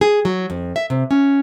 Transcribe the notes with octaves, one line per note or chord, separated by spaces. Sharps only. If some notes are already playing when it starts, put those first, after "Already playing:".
G#4
F#3
F2
E5
C3
C#4